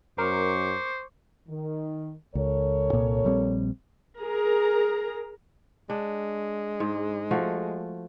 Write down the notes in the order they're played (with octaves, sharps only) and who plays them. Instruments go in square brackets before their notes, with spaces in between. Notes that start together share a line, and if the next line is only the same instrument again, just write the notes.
[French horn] F#2 [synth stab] A#4 [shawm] C5 [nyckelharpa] C#6 D6
[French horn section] D#3
[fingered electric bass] C#2 [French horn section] A4 A#4 C#5
[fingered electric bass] C2 A#2
A#1 G3 C4
[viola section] G#4 A#4 A#5
[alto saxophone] G#3 [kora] D4
[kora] G#2
F3 A3 F#4